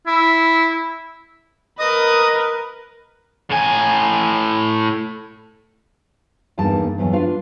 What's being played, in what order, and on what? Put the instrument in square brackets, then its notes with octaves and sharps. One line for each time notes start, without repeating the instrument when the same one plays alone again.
[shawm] E4
[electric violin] A#4 B4 [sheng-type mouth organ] D#5 D#6
[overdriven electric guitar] A2 G#5
[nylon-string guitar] E2 G2 D#3 A#3 A5
E2 G2 E3 F#3
D4 F4 B4 F5